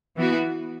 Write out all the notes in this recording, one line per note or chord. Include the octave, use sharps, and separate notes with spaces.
E3 B3 F#4